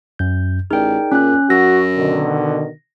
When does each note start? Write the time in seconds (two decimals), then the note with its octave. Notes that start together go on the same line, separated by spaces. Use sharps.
0.19 F#2 G6
0.71 A1 D#4 G#4 A#4 D5 G5
1.12 A#2 C#4 F#6
1.50 F#2 F#4 E6 A#6
1.96 B2 D3 D#3